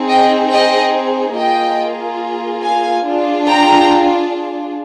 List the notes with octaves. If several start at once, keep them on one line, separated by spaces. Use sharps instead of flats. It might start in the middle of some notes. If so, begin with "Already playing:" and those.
Already playing: C4 D#4 G#4
D#5 G5
D#5 G5
A#3 F4 G#4 D#5 G5
F5 G#5
D4 F4 G#4
G5 A#5